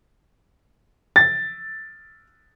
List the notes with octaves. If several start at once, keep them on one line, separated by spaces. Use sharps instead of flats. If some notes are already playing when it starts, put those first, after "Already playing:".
A6